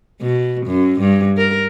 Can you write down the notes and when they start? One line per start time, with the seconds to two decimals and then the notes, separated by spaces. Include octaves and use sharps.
0.21 B2
0.67 F#2
1.01 G2
1.37 A#4